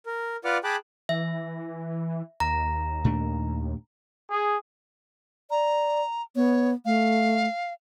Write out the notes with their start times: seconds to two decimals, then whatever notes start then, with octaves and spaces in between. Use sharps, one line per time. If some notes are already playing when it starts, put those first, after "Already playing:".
0.06 A#4
0.45 F4 B4 D5 F#5 D6 F6
0.64 G#4 G5 A5 B5 D6 F#6
1.09 E3 E5
2.40 D#2 A#5
3.04 A#2 A3 D4
4.30 G#4
5.51 D5 A#5
6.36 B3 C#5
6.85 A3 F5